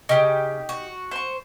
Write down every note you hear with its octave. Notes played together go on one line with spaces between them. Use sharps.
C#3 D#4 G4
F#4
C5 C#6